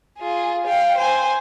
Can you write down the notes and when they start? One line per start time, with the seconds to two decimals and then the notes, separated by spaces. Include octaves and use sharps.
0.18 F4 G#4
0.67 F5 G5
0.98 C5 G#5